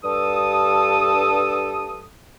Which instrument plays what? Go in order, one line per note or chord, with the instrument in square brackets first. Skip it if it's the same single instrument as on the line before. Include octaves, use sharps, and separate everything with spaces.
[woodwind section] G2 A4 D#6